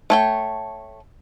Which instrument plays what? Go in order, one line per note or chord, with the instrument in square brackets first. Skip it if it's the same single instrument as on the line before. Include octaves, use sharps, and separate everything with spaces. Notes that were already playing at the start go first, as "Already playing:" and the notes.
[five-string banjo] A3 C#5 G5